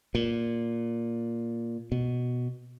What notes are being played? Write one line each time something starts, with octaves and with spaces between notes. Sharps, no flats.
A#2
B2